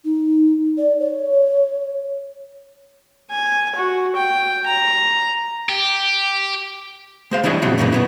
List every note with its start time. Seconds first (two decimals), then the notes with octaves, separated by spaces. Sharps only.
0.05 D#4
0.78 D5
1.00 C#5
3.31 G#5
3.75 F#4
4.15 G5
4.66 A#5
5.69 G4
7.31 G#3 C5 F5
7.43 E3 G3 D4 E4 C#5 D#5
7.62 E2 A#2 C#3 F#3 C4
7.78 F#2 A#2 C#3 E3 A#3 D#4
7.92 B2 B3 E4